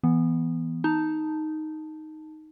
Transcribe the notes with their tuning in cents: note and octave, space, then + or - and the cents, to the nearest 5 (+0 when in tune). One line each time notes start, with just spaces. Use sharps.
E3 +0 B3 -5
D#4 +0 A5 +0